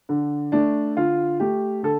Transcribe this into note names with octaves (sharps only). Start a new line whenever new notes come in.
D3
A3 D4
D3 F4
A3 G4
D3 A4